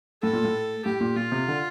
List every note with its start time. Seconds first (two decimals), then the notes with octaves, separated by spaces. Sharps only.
0.23 A2 A4
0.33 A#2
0.44 A2
0.85 A2 G4
1.01 A#2
1.16 A#2 F4
1.32 C3
1.48 D3